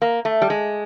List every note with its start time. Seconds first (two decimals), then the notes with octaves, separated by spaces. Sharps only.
0.02 A#3
0.25 A3
0.42 G3
0.50 G#3